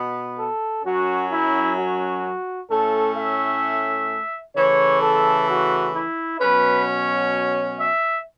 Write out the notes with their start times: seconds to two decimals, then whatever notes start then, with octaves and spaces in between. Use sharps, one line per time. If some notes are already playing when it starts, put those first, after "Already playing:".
Already playing: B2 B3
0.39 A4
0.84 F#2 F#3 C#4 F#4
1.31 E4
1.78 F#4
2.70 A2 A3 C#4 A4
3.16 E5
4.55 C#3 E3 A3 C#5
5.02 A4
5.48 F#4
5.95 E4
6.40 B2 F#3 C#4 B4
6.87 C#5
7.80 E5